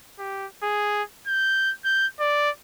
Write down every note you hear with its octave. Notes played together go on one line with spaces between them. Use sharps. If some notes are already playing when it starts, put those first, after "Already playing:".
G4
G#4
G6
G6
D5